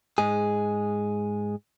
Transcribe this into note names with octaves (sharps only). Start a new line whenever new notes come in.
G#2 G#3 G#4